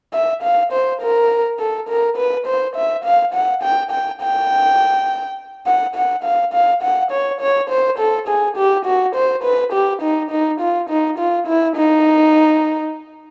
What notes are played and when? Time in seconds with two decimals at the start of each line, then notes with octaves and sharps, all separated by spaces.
0.13 E5
0.43 F5
0.73 C5
1.02 A#4
1.60 A4
1.89 A#4
2.17 B4
2.47 C5
2.76 E5
3.05 F5
3.34 F#5
3.63 G5
3.91 G5
4.22 G5
5.67 F#5
5.96 F#5
6.24 F5
6.54 F5
6.83 F#5
7.11 C#5
7.41 C#5
7.70 C5
7.99 A4
8.28 G#4
8.57 G4
8.86 F#4
9.15 C5
9.44 B4
9.73 G4
10.02 D#4
10.31 D#4
10.61 F4
10.90 D#4
11.19 F4
11.48 E4
11.76 D#4